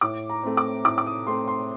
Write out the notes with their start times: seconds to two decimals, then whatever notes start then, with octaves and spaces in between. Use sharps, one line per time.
0.01 A2 D6
0.30 A#5
0.43 A3 C4
0.57 D6
0.85 A2 D6
0.98 D6
1.06 D#6
1.27 A3 C4 C6
1.48 C6